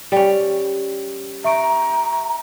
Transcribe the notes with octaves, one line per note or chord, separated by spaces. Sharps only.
G3 C#4
E5 A#5 C#6 D7